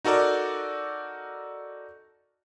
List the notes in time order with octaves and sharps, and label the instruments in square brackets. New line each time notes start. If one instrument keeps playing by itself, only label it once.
[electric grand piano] D#4 F#4 A4 A#4 D5